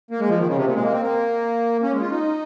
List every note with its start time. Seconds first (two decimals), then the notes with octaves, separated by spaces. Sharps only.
0.11 A#3
0.20 G#3
0.29 F3
0.38 D#3
0.47 C#3
0.56 C3
0.65 A#2
0.75 G#3
0.83 A#3
0.92 C4
1.01 A#3
1.83 C#4
1.92 G#3
2.01 F4
2.10 D#4